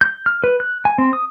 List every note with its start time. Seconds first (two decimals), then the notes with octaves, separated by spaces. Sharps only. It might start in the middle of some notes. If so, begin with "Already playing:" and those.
0.01 G6
0.26 F6
0.44 B4
0.60 F#6
0.85 G#5
0.98 C4
1.13 D#6